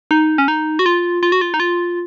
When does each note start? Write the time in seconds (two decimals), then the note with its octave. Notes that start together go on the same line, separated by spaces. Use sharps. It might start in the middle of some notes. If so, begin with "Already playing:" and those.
0.11 D#4
0.38 C#4
0.48 D#4
0.79 F#4
0.86 F4
1.23 F4
1.32 F#4
1.41 F4
1.54 D#4
1.60 F4